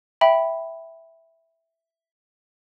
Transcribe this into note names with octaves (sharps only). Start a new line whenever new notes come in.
E5 G5 B5